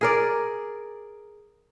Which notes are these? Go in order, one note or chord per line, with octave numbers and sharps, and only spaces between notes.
G#4 A#4 D5